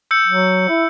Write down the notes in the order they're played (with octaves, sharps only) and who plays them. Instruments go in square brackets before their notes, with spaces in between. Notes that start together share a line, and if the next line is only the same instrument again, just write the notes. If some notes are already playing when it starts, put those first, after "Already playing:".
[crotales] E6 G6 C#7
[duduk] F#3
E4